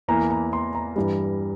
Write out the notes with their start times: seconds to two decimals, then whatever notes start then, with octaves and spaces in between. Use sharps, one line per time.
0.08 E2 E3 A#3 A#5
0.31 A#5
0.53 C6
0.75 A#5
0.96 G2 E3 G3